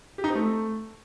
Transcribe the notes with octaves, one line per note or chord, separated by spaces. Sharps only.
G4
D#4
C4
A3